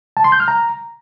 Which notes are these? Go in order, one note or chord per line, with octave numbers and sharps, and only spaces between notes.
A5
C6
G6
F6
A#5